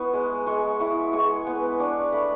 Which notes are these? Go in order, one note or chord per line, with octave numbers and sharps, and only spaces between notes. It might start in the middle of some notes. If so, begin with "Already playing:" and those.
Already playing: B3 E4 B5 C#6
G#3
G#3 C#6
E4 C#6
G#3 C#6
B3
D4 C#6
A3 B5